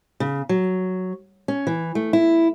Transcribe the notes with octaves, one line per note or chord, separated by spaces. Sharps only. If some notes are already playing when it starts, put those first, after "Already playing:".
C#3
F#3
C#4
E3
A3
E4